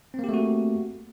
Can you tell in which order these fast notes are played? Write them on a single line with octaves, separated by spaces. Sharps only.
C4 A#3 G4 A3 F#4